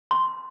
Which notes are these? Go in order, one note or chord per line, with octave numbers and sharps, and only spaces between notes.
C6